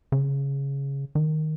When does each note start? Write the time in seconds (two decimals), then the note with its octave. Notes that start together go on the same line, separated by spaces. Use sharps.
0.12 C#3
1.15 D#3